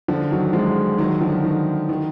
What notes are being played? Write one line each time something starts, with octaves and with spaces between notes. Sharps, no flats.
D3 F3
D#3 F#3
F3 G#3
D#3 F#3
D3 F3
D#3
D#3